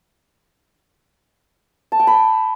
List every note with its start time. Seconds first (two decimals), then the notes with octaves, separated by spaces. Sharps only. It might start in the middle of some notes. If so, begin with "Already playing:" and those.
1.92 A5
2.00 G5
2.07 B5